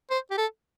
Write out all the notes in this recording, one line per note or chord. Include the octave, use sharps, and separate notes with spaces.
C5
G4
A4